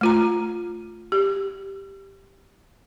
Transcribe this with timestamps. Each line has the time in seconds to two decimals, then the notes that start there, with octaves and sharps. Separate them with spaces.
0.01 A3 F4 A#5
1.12 G4